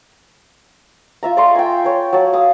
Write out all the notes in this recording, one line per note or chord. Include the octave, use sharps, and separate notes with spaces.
F4 E5 A#5
D5 A#5 C6 C#6
G5 G#5
C#5 A5
F#3 A5
F5 D#6